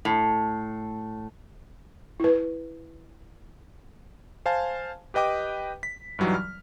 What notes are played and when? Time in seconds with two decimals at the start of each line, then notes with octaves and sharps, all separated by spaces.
0.05 A2
2.20 E4 B4
4.46 C5 F5 G#5 A5
5.14 G4 B4 D#5 G5 D6
5.83 B6
6.19 G2 E3 F#3 G3 D#4
6.34 F6